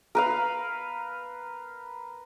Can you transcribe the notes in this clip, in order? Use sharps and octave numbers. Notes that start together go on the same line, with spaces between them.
A#4 B4 F5